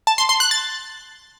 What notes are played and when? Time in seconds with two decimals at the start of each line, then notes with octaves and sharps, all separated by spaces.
0.07 A5
0.18 C6
0.29 C6
0.40 F#6
0.51 A6